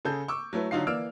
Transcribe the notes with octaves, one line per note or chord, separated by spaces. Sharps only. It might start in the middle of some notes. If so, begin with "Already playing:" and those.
C#3 G#4 A4 G6
C#6 D6 E6
F#3 A3 E4 B4
D3 F#3 D#4 F4 C7
E3 A#3 D5 E6 F6 D7